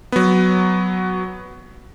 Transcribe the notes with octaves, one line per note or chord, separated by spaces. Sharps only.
F#3 B3